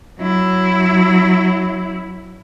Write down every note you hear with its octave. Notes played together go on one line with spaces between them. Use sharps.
F#3 E4